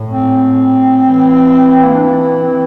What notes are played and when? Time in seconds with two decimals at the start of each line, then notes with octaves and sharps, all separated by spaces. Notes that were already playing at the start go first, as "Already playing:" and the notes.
Already playing: A2
0.10 C4
1.07 E3
1.84 A#3
1.95 D4
2.03 C4
2.41 C4